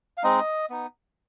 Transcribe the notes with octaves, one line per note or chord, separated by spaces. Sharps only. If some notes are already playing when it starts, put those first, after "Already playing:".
F5
G#3 C4 D#4 D#5
B3 D#4